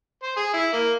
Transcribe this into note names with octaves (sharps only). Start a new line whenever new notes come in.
C5
G#4
E4
A#3